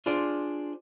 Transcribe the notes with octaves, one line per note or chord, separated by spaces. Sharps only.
D4 F4 G#4 C5 D5